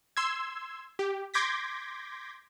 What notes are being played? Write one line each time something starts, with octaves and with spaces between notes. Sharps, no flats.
C6 E6 G#6
G4
C6 D6 G6 G#6 A#6 B6